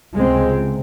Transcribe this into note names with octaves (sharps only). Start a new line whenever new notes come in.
C#2 C3 G#3 C4